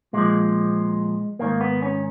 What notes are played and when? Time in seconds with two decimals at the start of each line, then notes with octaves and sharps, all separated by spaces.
0.13 A#2 F3 G#3
1.39 G#2 D#3 A#3
1.61 B3
1.82 C#4